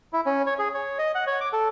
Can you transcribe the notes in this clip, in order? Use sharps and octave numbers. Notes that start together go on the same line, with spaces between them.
E4
C#4
C#5
G#4
C#5
D#5
F#5
C#5
D6
A4